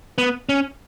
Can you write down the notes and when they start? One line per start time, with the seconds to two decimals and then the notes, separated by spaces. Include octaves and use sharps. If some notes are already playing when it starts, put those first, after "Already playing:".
0.18 B3
0.49 C#4